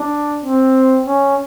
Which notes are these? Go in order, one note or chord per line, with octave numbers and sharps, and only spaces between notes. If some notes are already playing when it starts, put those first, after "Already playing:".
Already playing: D4
C4
C#4